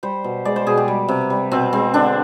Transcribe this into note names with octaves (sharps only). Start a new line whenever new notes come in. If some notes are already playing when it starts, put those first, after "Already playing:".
G3 C5
B2
G#3 D5
C5
B2 G#4
G4
G3
C3
G3
B2 C4
G#3 C4
D3 D4